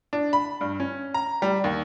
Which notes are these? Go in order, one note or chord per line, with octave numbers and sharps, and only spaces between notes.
D4
B5
G2
C#4
A#5
G3
D#2